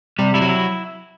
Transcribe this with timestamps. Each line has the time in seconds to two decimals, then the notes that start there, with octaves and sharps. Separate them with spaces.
0.19 C3 G3
0.34 G3 E4
0.42 F#3
0.49 E4